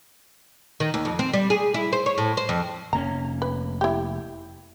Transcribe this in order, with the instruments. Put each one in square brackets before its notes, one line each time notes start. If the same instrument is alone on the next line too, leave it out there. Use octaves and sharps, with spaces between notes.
[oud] D#3
D#2
F2
C4
G3
G#4
E4
C5
C#5
A2
C5
F2
[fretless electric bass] F1 A#3 C#4 [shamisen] A#5
[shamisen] B4
E4 G4